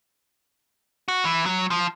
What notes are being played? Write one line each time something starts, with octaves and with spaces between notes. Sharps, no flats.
F#4
E3
F#3
F3